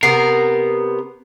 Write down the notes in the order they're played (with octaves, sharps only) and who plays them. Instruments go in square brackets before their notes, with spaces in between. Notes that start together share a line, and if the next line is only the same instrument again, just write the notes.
[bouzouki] C3 B3 [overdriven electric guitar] A#4 [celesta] C7